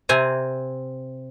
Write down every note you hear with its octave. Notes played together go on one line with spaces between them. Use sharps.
C3 C4 G#5 A#5